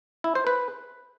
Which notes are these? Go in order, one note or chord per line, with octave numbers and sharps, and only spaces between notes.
E4
C5
B4